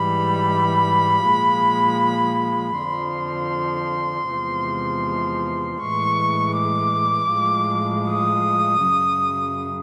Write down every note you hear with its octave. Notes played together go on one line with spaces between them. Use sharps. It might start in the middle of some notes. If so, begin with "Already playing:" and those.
Already playing: G#2 E3 G3 B5
A#2 F3 G#3
F2 D3 F3 C6
E2 C3 F3 G#3
A2 E3 G#3 C#6
D6
A2 F3 G#3
D#6
F#2 C#3 F#3